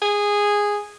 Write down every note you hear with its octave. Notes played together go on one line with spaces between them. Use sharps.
G#4